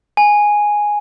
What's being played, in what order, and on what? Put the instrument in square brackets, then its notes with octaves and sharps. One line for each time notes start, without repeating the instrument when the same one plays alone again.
[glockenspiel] G#5